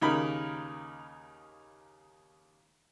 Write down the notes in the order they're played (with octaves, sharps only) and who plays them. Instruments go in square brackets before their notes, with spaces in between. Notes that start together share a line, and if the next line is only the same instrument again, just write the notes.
[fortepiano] D#2 C#3 D#4 A#4 B5